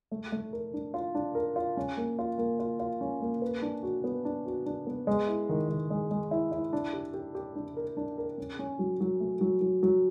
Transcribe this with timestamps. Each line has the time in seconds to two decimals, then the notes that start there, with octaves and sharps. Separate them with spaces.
0.11 A3
0.32 A3
0.53 A#4
0.73 D4
0.94 F4
1.15 D4
1.35 A#4
1.56 F4
1.77 C#4
1.97 A#3
2.19 F4
2.38 A#3
2.59 F4
2.80 F4
3.01 C#4
3.21 A#3
3.42 B4
3.62 D4
3.83 F#4
4.04 B3
4.25 D4
4.46 F#4
4.66 D4
4.87 B3
5.07 G#3
5.27 E4
5.49 D#3
5.69 D#3
5.90 G#3
6.11 G#3
6.31 E4
6.52 E4
6.73 D4
6.93 G4
7.14 G4
7.35 G4
7.55 D4
7.77 A#4
7.97 D4
8.18 A#4
8.38 C#4
8.59 C#4
8.79 F#3
9.01 F#3
9.20 A3
9.41 F#3
9.61 F#3
9.83 F#3